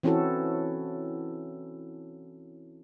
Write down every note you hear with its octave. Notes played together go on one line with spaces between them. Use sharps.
E3 C4 C#4 E4 F#4 A4